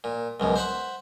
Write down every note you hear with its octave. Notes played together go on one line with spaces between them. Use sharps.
A#2
C#2 F#2 B2
C5 E5 F#5 B5 C6